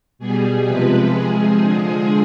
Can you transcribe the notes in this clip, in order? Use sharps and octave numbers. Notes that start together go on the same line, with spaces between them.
B2 G3 G#4
C3 F3 G#3 B4
C3 F3 G#3 G#4
D3 F3 G#3